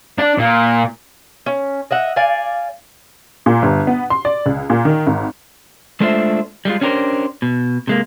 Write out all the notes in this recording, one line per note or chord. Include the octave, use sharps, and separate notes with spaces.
D4
A#2
C#4
D#5 E5 F#5
D5 F5 G#5
A#2
G1
B3
C6
D5
C#2
A#2
D#3
G#1
G#3 A3 D4 F4 C5 E5
G3 G#3 F4
C#4 D4 G4 A4 A#4 C5
B2
C3 G#3 A#3